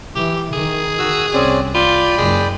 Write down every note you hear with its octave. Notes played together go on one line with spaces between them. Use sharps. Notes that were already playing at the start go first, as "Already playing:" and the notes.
E3 G4
D#3 G#4
F#4 E6
C2 C4 C#4 D5
F4 D5 G5 B5
F#1 G#3